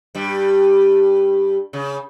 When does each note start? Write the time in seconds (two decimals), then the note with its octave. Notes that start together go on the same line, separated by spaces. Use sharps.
0.15 G2 G3
1.73 C#3